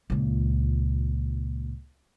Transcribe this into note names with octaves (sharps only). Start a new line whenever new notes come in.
C#2 A#2